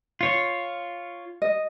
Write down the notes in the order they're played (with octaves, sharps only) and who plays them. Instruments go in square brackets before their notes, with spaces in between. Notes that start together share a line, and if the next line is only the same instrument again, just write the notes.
[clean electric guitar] F4 C#5
[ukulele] D#5